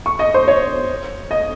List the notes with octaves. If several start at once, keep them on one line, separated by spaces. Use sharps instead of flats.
C#6
D#5
C5
C#5
D#5